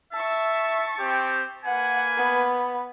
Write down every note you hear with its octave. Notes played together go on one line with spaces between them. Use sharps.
E5 A5 C#6
C4 G4
A#3 B4 F#5 G#5
B3